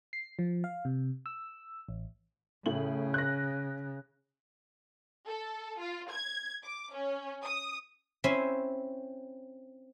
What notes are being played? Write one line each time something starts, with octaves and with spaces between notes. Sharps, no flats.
C7
F3
F5
C3
E6
A1
A2 C#3 F#7
F#6 A#6
A4
F4
G#6
D6
C#4
D#6
C4 C#4 E4 C5 E5 G#5